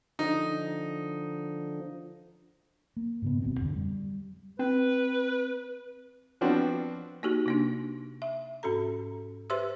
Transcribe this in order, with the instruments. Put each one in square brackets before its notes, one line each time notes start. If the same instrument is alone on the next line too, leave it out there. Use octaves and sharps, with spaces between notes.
[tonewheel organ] D3 F3 [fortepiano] D#4
[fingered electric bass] A#3
G#2 C#3 B3
G#1 D2 B2 C4
F2 D3
G3
[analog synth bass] C4 [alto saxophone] B4
[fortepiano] F3 B3 C4 D4 F#4
[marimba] A#3 D#4 F#4 G4
C3 A#3 D4
E5
G#2 C#4 F#4 A4 A#5
G4 B4 C5 E5 C6 E6